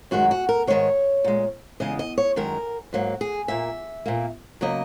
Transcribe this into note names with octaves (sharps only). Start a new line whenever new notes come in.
F#2 D#3 G#3 F#4
F#4
A#4
G#2 D#3 G#3 C#5
A#2 G#3
E2 C#3 G#3 D#5
D#5
C#5
F#2 D#3 G#3 A#4
G#2 F#3 A#3
G#4
A#2 A#3 E5
A#2 A#3
C#3 F#3 A#3 D#5